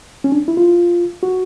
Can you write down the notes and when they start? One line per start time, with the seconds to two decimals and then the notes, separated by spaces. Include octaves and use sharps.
0.24 C#4
0.32 D4
0.48 E4
0.57 F4
1.23 F#4